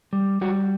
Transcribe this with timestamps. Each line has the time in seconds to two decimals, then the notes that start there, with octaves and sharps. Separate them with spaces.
0.13 G3
0.41 G3 F#4